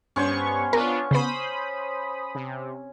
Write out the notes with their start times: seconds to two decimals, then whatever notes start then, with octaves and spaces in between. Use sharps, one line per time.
0.16 G2 B3 C#4 C5 C#5 C#6
0.73 B3 D4 F4 A#4 C#6
1.11 C#3 B3 C5 B5 D#6
2.35 C3